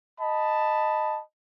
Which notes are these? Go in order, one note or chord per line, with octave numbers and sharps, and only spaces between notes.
D#5 A5 B5